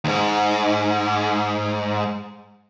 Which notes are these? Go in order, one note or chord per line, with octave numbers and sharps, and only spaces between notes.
D#2 G#2